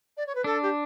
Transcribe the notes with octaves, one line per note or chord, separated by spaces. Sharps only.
D5
C#5
B4
D4 A4
G4